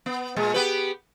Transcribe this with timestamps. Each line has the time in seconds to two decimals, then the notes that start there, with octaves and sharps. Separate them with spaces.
0.06 B3
0.36 A#2 G#3
0.54 B3 G4 B4